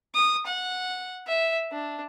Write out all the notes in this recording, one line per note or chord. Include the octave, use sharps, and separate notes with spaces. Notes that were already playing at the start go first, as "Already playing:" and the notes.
D#6
F#5
E5
D4